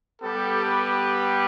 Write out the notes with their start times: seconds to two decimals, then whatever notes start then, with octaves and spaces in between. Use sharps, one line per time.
0.21 G3 B3 G4 A4
0.65 B4